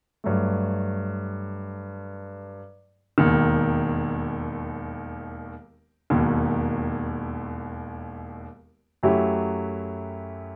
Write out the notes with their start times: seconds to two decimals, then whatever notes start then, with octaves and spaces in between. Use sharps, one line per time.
0.24 G2 F#3 A3
3.18 E1 D#2 D#3
6.10 E1 D#2 D#3
9.03 F#2 F#3 A3 E4 G4